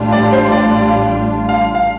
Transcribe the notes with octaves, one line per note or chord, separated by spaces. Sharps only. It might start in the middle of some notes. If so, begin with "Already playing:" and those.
Already playing: A1 A2 G3 D4 F4
D5
C5
D5
F5
F5